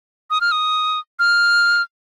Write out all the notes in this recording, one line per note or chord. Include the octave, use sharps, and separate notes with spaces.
D#6
F6
D#6
F6